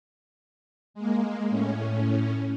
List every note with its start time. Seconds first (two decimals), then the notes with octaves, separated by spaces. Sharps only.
0.94 G#3 A#3
1.50 A2 C#4